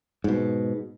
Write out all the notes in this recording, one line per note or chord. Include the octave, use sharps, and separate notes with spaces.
G#2 B2